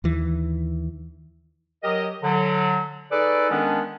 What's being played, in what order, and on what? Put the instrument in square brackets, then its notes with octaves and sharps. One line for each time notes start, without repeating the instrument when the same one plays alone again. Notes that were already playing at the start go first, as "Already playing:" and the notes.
[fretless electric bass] D#2 E3
[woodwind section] F#3 G4 A#4 D#5
D3 F#3
D#4 G#4 A4 B4 D5
D#3 G#3 B3 C#4 D4